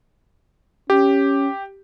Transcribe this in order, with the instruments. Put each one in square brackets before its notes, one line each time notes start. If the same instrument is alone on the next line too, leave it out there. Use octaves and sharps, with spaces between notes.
[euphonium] C#4 [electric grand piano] G4